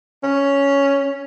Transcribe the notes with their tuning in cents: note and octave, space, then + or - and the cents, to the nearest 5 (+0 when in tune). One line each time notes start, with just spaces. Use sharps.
C#4 +5